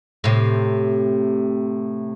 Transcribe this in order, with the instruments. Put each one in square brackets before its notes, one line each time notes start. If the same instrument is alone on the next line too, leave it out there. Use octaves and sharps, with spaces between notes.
[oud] A2 C3